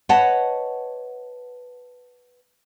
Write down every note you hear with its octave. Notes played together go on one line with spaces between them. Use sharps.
B4 C#5 D#5 F#5 A5